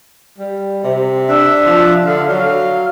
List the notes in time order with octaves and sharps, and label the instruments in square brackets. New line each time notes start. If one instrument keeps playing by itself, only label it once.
[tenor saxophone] G3
C3
[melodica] D4 E5
[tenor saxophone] F3
[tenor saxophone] D3 [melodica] F5
[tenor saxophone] F#3 [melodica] F5